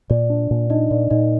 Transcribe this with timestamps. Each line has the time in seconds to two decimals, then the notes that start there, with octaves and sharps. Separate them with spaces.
0.10 A#2 D5
0.30 D4
0.51 A#2
0.70 D4 D#4 D#5
0.91 A#2 D5
1.10 A#2 D#4 D#5